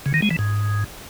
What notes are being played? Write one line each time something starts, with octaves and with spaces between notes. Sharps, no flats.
C#3
D#3
G#3
E3
G#2